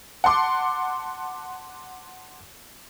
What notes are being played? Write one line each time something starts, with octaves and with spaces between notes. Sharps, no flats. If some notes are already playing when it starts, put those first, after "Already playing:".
F#5 A5 C6 D6